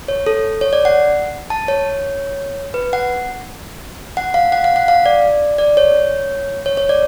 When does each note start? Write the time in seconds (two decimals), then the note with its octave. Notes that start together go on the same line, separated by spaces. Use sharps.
0.08 C#5
0.26 A4
0.61 C#5
0.73 D5
0.85 F#5
1.50 A5
1.68 C#5
2.74 B4
2.93 F#5
4.17 F#5
4.34 F5
4.52 F#5
4.64 F5
4.76 F#5
4.88 F5
5.06 D5
5.58 D5
5.77 C#5
6.66 C#5
6.77 C#5
6.89 D5